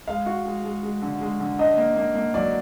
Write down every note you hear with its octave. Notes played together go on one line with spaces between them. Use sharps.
G#3 F5
F#4
G#3
G#3
G#3
D3
G#3
D3
D4 D#5
A#3
A#3
A#3
F#3 D5